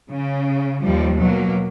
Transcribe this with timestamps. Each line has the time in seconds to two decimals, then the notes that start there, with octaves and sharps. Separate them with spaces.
0.10 C#3
0.82 D#2 F3 G3
1.19 B2 F#3 A#3